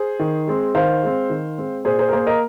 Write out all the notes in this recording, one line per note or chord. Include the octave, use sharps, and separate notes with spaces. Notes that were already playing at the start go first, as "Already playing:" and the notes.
Already playing: G#4 C5
D#3
G#3 C4
D#3 C5 F5
G#3 C4
D#3
G#3 C4
A#2 G#4 C5
G#4 C5
A#4
A#3 G#4 C5
A#4 D#5